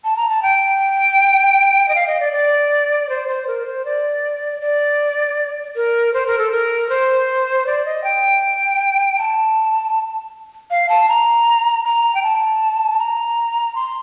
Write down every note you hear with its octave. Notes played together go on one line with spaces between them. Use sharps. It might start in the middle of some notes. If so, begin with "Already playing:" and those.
A5
A#5
A5
G5
D#5
F5
D#5
D5
D5
C5
C5
A#4
C5
D5
D5
A#4
C5
A#4
A4
A#4
C5
D5
D#5
G5
A5
F5
A5
A#5
A#5
G5
A5
A#5
C6